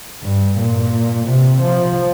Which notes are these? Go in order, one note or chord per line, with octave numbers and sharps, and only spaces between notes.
G2
A#2
C3
F3